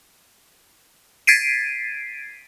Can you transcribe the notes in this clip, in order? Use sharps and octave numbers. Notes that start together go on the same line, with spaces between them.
G#6 A6 B6 C7 D7 D#7